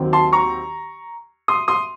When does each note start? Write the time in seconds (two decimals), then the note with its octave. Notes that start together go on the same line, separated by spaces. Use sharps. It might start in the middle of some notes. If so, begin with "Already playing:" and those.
Already playing: D#2 D#3 F#3 C4
0.13 A5 C6
0.33 A#5 C#6
1.48 C6 D#6
1.68 C6 D#6